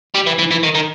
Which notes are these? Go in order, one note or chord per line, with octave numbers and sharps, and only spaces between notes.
G3
E3
E3
E3
D#3
D#3